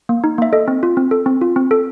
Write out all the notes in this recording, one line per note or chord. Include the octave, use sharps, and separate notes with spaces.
A#3
D#4
A#3 E5
A4 D#5
C4
F4
C4
A4
C4
F4
C4
A4